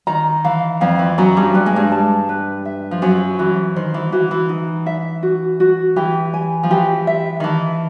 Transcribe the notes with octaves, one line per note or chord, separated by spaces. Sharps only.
D#3 A#5
E3 F5
F2 F3 F5
E3
F#2 F#3 A#5
G2 G3
G3 B4
G#3
G2 G3
A5
B4
E5
F3
F#2 F#3 C5
E3 F#4
D#3 C5
E3
E3 F#4
E3
D#4
E5
F#4
F#4
E3 G4
G#5
F3
E3 G4
E5
D#3 E3 A5